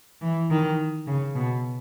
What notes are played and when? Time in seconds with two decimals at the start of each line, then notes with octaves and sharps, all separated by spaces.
0.21 E3
0.50 D#3
1.07 C#3
1.35 B2